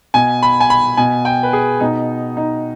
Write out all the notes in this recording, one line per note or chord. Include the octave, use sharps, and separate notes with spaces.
B2 G#5
B5
G#5
B5
B2 G#5
G5
B4
G#4
B2 D#4
D#4